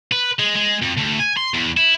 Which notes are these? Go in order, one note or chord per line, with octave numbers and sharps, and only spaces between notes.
B4
G#3
G#3
F2
D2
G#5
C6
E2
E4